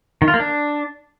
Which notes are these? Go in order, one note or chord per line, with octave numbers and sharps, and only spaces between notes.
D#3
F4
A#3
D4